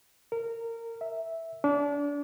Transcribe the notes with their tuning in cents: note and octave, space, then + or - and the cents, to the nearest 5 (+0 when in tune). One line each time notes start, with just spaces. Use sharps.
A#4 -20
E5 -5
D4 -30